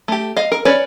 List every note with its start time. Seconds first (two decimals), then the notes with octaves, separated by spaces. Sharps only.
0.08 A3 G4
0.37 D#5 F5
0.52 A#4
0.65 C#4 B4 C#5 D5